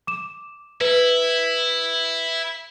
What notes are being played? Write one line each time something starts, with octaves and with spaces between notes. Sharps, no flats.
D6 E7
E4 B4